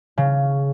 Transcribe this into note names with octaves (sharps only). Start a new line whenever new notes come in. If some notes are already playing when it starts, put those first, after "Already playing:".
C#3